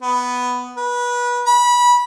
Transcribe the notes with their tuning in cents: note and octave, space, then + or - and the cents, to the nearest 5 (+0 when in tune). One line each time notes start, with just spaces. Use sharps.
B3 +5
B4 -25
B5 -20